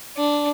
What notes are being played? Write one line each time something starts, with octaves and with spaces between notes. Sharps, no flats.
D4